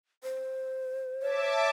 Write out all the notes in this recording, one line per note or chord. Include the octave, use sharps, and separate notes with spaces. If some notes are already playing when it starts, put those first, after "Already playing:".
C5
C#5 E5 A5 D6